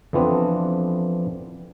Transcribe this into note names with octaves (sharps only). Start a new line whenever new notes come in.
F2 E3 F3 B3 C4 D4